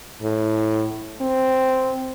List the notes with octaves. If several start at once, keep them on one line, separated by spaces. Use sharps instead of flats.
A2
C4